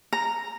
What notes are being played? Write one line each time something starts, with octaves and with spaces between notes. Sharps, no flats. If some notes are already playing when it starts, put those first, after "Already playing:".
A#5